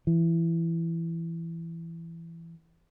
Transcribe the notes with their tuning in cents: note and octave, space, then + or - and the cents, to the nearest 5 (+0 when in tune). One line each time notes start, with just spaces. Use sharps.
E3 +15